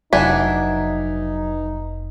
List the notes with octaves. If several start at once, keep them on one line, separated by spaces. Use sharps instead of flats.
F1 E3 F#3 D4 D#4 F#5 G#6 B6